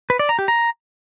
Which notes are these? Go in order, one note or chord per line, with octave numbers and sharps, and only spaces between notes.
B4
D5
A#5
G4
A#5